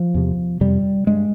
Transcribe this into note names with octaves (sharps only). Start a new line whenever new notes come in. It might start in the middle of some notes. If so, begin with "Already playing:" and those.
Already playing: F3
E2 C3
F2 C3 G3
G2 G#3